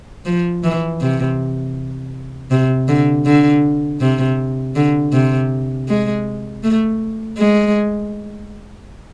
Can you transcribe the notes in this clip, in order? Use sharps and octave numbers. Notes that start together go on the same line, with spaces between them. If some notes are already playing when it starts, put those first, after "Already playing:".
F3
E3
C3
C3
D3
D3
C3
D3
C3
G#3
A3
G#3